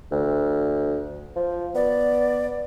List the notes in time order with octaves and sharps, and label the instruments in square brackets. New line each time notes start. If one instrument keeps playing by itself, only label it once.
[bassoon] D2
F3
[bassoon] B3 [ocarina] D5